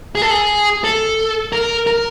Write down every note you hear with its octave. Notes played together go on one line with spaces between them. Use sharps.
G#4
A4
G#4
A4
A#4
A#4